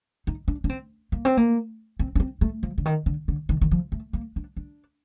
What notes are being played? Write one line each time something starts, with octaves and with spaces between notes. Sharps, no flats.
D#4
D4
D4
C4
A#3
C4
A#3
C4
D4
C4
A3
F3
D3
D#3
D3
D3
D#3
D#3
F3
A3
A#3
D4
D4